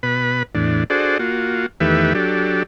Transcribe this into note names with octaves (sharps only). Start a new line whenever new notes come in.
B2 B4 B5
E2 A2 D4
D4 F#4 G#4 A4 C5 D5
A#3 F4 F#4
E2 D#3 A3 G4 B4 E5
F#3 D4 G4 A4